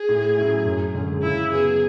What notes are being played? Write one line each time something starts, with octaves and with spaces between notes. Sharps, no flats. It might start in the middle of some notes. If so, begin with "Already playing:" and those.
Already playing: G#4
A2
F#3 C#4 E4
F#2
D3 G#3 C#4
C#3 E4
F#3 B3 G#4